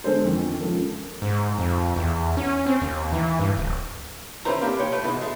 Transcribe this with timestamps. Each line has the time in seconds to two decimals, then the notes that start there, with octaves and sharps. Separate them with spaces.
0.04 D3 G#3 B3 A4 A#4 C5
0.24 F2 D3 D#3
0.60 C#3 F3 G#3 A4 A#4
1.22 G#2
1.58 F2
1.96 E2
2.37 C#4
2.67 C4
2.81 D#2
3.13 E3
3.39 G2
3.57 D1
4.45 E3 C#4 A4 B4 C5 A#5
4.61 A#3 C4 D4 G4 A#4
4.77 B4 C#5 G5
4.92 A3 B4
5.04 G#2 B2 E3 G#3
5.21 G#3 A3